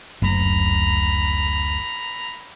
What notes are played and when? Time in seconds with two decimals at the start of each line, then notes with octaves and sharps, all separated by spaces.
0.22 F#1 D2 A#5 B5